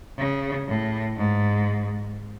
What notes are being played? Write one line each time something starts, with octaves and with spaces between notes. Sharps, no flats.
C#3
A2
G#2